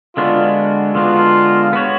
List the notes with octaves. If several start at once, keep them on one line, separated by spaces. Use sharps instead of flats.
D3 G#3 B3 D4 F4 F#4
D3 G#3 B3 D4 F4 F#4
B3 F#4 C#5